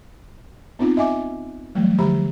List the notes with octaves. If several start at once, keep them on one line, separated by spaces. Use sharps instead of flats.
B3 C4 D#4 F4
D#5 E5 G#5 D6
E3 F#3 G3 A3
D3 F3 G4 A#5 B5